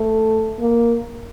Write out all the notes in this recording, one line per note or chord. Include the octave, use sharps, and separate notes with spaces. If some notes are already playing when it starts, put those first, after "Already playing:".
Already playing: A3
A#3